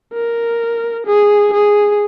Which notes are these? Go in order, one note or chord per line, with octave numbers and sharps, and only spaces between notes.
A#4
G#4
G#4